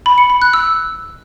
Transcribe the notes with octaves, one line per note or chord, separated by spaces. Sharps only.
B5
C#7
B5
F#6
E6